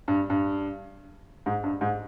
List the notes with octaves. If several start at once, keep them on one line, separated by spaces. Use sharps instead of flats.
G2
G2
G#2
G2
G#2